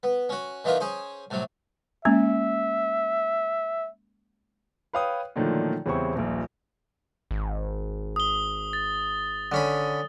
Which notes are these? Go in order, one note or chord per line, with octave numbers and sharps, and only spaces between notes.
B3
C#4 F#4
D#3 E3 B3 F4 G4 A#4
C#4 G#4 C5
A2 C3 F#3
G#3 A#3 C#4 E5
B4 C#5 F5 G5 D#6
A#2 D3 D#3 F3 F#3 A3
E2 C#3 G3 C4 E4 C#6
D#1 A#1
G#1
D#6 G7
A6
D3 C#4 B5